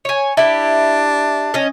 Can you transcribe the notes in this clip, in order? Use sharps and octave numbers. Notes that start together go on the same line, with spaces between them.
C#5 G#5
D4 E4 G4
C#4 D#5